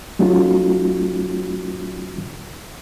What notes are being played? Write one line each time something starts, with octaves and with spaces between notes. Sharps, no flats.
F#3 A3 C#4 D#4 F4 F#4